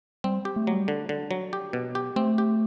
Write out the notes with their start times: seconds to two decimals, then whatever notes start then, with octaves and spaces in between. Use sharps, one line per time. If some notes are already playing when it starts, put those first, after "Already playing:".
0.24 G3 C4
0.45 G4
0.56 A3
0.67 F#3
0.73 G3
0.88 D3
1.09 D3
1.31 F#3
1.53 G4
1.73 B2
1.95 G4
2.16 A3 C4
2.38 G4